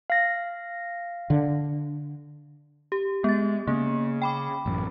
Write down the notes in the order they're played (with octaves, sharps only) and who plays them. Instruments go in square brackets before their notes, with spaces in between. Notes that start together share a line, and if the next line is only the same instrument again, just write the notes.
[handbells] F5 A#6
[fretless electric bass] D3
[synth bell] G4
[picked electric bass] G#3 [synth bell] B3 A6
[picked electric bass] C#3 [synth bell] A#3
[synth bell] G5 B5 D6
[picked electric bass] A1 F#2